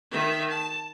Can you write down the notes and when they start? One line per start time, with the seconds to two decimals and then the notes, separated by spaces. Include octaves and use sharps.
0.11 D#3 E5
0.50 A5